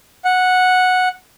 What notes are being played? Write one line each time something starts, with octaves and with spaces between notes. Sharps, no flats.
F#5